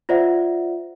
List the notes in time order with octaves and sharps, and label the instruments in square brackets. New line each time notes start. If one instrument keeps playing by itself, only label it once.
[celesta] F4 C5 D5 E5 F#5